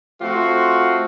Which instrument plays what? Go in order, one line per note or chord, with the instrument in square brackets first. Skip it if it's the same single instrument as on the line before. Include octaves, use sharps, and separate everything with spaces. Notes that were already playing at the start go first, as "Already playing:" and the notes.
[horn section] A3 C4 F4 F#4